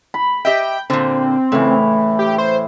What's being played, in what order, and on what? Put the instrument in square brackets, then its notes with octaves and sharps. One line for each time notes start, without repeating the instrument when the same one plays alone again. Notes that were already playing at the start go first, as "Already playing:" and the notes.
[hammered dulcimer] B5
[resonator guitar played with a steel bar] G4 D#5 E5 [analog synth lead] G5
[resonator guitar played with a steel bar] A#2 D3 [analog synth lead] C4
[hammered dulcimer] A2 E3 [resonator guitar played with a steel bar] C#3
[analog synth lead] G4
C5